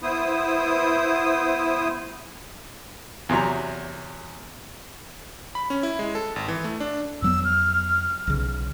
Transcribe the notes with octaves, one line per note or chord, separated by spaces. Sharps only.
B3 E4 C5 D#6
E2 C3 F#3 A#5
B5
C#4
E4
G#3
A4
G#1
E3
A3
D4
F2 F#3 B3 E6
F6
B1 C#3